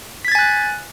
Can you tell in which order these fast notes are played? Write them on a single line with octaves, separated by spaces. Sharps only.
B6 G#6 A6 G#5 F#6